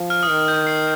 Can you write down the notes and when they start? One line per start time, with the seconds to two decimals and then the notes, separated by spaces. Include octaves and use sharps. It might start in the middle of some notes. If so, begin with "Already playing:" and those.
Already playing: F3
0.10 F6
0.23 D#6
0.29 D#3 F6
0.48 G6
0.67 C7